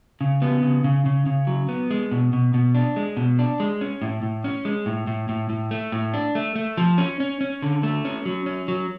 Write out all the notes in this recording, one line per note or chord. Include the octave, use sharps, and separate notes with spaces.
C#3
B3
C#3
C#3
C#3
C#3
F#3
B3
G#3
B2
B2
B2
D4
G#3
B2
D4
G#3
C#4
A2
A2
C#4
G#3
A2
A2
A2
A2
A3
A2
D4
A3
A3
F3
C#4
C#4
C#4
D3
A3
C#4
F#3
C#4
F#3